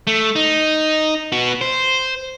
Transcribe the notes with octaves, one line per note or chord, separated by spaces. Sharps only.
A3
D#4
B3 F#4
C5